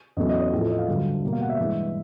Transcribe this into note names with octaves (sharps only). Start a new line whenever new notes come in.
E2 C#3 F#3 A3 D#5
D#5
C#5
A2 F3 A3 G#4
A4
D#5
F5
G2 D3 F#3
B2 G3 A#3
F5
F#5
E5
G2 E3 G#3